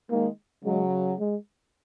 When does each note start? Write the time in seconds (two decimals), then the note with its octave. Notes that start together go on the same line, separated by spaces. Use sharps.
0.10 D#3 G#3 A#3
0.64 C#3 F#3 G#3
1.20 G#3